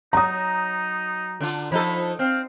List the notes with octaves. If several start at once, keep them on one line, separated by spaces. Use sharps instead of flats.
F#3 D#4 A#5 D#6
D3 D4 F4
F3 D#4 A4 B5
C4 F5